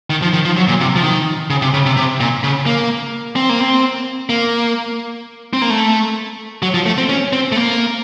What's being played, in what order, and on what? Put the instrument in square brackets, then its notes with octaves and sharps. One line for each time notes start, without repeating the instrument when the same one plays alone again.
[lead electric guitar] D#3
F3
D#3
F3
F#3
A#2
C3
F3
D#3
C#3
C3
C#3
C3
C3
A#2
C#3
A#3
C4
A#3
C4
A#3
C4
A#3
A3
F#3
F3
A3
C4
C#4
C4
A3
A#3